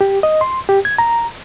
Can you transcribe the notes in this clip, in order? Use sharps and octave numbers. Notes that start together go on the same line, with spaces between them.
G4
D#5
C6
G4
G#6
A#5